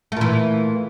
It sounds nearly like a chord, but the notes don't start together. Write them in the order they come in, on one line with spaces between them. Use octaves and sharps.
A3 A#2 E3